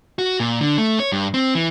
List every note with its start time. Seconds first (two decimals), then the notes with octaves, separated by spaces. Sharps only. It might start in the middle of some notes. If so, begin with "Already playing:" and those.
0.19 F#4
0.40 A#2
0.61 D3
0.78 A3
1.00 C#5
1.12 G2
1.34 C4
1.55 E3